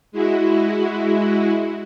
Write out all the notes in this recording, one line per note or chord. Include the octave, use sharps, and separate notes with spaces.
G#3 E4 F#4